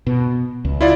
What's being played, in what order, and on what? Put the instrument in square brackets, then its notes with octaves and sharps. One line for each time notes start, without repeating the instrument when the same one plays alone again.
[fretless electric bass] B2
C#2
[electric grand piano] E4 F4 D5